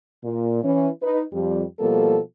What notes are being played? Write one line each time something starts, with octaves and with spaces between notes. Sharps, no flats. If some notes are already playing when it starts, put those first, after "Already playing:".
A#2
E3 C#4
D#4 B4
F2 G3
B2 F3 G3 A#3 A4